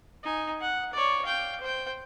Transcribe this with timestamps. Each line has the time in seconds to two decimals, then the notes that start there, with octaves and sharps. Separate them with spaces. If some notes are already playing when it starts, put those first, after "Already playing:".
0.23 D#4 G#5
0.60 F#5
0.93 C#5 D5
1.25 F5 G5
1.61 C5 G5